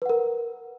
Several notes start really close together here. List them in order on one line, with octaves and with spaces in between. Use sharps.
B4 F#5 A#4